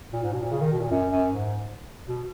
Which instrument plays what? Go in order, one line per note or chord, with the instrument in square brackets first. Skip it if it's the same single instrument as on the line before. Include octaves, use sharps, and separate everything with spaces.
[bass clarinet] A#2
G#2
B2
A#2
C#3
D#3
B2
A#2
F#2
F#2
G#2
B2